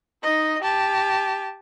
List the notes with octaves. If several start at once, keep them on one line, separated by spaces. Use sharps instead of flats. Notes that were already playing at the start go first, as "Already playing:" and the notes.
D#4 D#5
G4 A5